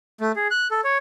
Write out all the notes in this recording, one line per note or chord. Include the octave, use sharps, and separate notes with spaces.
A3
G#4
F#6
A4
C#5